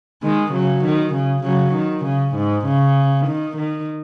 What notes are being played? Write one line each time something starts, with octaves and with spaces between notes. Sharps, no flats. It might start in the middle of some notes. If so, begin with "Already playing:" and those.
D#3 G#3
C#3 F#3
D#3
C#3
C#3 F#3
D#3
C#3
G#2
C#3
D#3
D#3